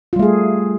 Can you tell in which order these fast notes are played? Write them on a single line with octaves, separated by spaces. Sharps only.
F4 G3 A3 G#4